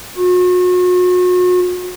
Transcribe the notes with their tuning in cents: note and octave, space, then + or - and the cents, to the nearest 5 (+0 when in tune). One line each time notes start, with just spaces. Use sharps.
F#4 -40